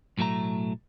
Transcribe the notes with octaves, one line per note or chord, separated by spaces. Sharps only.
B1 A2 F#3 A3 A#5